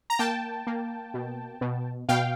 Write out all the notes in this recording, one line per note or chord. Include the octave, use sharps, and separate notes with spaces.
A#5
A#3 G5 A5
A#3
B2
B2
B2 F5 G5